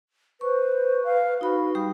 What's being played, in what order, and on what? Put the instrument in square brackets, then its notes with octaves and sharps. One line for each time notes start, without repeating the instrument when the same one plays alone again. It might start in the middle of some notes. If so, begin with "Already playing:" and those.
[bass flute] B4 [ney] C5 [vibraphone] C#6
[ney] F5
[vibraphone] D#4 B5 [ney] F#4
[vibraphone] G3 G4 D#6